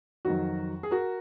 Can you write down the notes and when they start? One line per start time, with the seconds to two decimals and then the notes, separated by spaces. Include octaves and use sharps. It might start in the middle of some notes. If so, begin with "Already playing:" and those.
0.25 F2 D#3 F#3 F#4
0.83 G#4
0.91 F#4 A#4